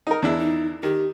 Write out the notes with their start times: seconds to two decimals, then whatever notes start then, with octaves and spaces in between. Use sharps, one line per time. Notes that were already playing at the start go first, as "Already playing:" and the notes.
0.07 D#4 A#4
0.22 E2 D4 E4
0.40 D#4
0.83 D#3 G4